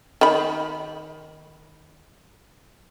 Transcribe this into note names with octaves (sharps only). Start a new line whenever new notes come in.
D#3 B5